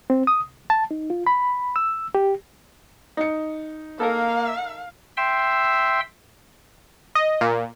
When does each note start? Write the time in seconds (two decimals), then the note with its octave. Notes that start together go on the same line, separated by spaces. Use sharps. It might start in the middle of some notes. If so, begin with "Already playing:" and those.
0.10 C4
0.27 D#6
0.40 C2
0.70 A5
0.91 D#4
1.10 F4
1.27 B5
1.76 E6
2.15 G4
3.17 D#4 C#7
4.00 A#3 A4 A#4 F5
5.17 E5 G5 C6 E6
7.15 D#5
7.41 A#2